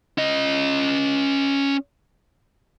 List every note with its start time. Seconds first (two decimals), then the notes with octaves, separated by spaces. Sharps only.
0.18 C#4 D#5